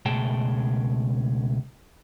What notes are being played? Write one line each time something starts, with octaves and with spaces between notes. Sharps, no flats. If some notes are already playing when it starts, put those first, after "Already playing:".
C#2 B2 A3 G#4 G5 A5